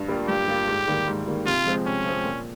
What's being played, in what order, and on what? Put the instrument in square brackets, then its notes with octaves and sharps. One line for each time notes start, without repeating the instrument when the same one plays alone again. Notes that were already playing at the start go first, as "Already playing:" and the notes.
Already playing: [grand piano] G2
G3 A#3 F4
[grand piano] G2 [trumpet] G4
[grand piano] G3 A#3 F4
G#2
D#3 G3 A#3
G#2
D#3 G3 A#3
[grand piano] C3 [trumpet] F4
[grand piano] F3 G#3 C4
[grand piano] C3 [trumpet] C#4
[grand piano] F3 G#3 C4
A#2